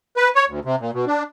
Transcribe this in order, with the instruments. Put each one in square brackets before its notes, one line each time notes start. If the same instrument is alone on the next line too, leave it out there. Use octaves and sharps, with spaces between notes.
[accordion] B4
C#5
D2
C3
A#2
B2
D4